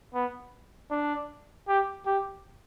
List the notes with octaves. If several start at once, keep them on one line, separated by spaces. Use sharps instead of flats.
B3
D4
G4
G4